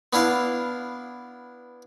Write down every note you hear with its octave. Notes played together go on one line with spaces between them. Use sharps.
B3 D4 E4 F5